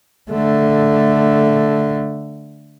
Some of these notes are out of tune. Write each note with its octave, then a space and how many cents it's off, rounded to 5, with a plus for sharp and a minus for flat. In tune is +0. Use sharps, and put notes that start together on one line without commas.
D3 +0 A3 +0